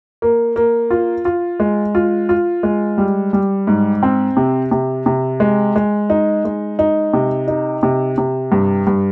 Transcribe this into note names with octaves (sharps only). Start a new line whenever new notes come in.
A#3
A#3
F4
F4
G#3
F4
F4
G#3
G3
G3
G#2
C4
C3
C3
C3
G#3
G#3
D#4
G#3
D#4
C3
D#4
C3
C3
G2
G2